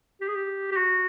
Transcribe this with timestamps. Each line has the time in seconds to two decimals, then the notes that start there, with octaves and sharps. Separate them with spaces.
0.21 G4
0.28 G#4
0.35 G4
0.72 G4
0.76 F#4